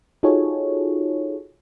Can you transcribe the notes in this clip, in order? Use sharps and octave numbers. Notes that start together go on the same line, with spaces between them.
D#4 F4 F#4 G#4 A4 C#5